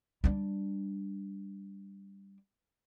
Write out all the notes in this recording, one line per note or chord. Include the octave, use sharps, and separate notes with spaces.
G3 D4